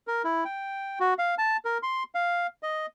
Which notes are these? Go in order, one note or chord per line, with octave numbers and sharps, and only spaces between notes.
A#4
E4
G5
F#4
F5
A5
A#4
C6
F5
D#5